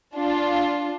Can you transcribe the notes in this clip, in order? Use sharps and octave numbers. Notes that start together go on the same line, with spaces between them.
D4 F4